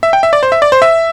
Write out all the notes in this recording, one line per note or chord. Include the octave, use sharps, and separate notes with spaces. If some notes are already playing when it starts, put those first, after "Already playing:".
E5
G5
E5
D5
C5
E5
D5
C5
E5